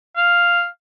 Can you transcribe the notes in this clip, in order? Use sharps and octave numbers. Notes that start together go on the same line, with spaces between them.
F5